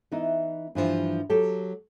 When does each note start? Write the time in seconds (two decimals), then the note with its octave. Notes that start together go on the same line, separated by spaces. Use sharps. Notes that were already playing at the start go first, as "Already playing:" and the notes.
0.12 E3 B3 D#4 E4
0.75 G2 E3 F3 G3
1.30 F#3 G4 A4